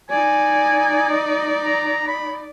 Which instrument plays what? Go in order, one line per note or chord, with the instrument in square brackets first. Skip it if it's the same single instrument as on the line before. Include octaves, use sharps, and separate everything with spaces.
[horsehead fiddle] D#4 D5 [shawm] G#5
[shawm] D#5
A#5
B5